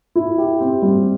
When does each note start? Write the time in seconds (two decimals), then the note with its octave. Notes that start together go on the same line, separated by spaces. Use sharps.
0.15 E4
0.38 G4
0.60 C4
0.82 G3